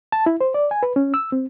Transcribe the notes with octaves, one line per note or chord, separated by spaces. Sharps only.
A5
E4
C5
D5
G#5
B4
C#4
E6
C4